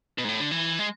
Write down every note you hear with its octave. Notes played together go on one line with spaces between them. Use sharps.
B2
G#2
A2
D3
E3
G#3